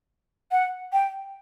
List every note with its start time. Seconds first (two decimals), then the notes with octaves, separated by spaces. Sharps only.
0.52 F#5
0.93 G5